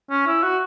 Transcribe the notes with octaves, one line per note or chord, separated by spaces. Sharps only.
C#4
E4
F#4